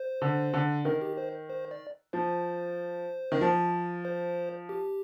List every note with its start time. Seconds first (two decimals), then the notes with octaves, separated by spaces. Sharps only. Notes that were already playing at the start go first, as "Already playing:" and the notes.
Already playing: C5
0.22 D3
0.54 D3
0.85 D#3 A#4
1.02 G4
1.17 C5
1.50 C5
1.71 D5
2.13 F3 C5
3.32 D#3
3.41 F3
4.05 C5
4.69 G4